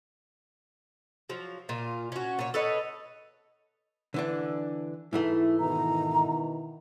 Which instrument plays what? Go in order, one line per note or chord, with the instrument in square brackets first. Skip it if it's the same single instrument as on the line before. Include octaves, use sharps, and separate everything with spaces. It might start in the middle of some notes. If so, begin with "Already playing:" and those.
[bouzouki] F3 F#3
A#2 F4
C#4 F#4
A#2 C#5
A4 B4 C#5 D#5
[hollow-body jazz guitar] D3 E3 D4
[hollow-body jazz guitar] G#2 E3 A3 [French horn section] E4
[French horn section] B2 D#3 E4 [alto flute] A#5